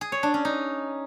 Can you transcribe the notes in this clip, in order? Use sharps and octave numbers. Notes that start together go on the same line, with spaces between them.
G#4
C#5
D4
C#4
D#4